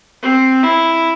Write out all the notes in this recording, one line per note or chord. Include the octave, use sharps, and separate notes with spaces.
C4
E4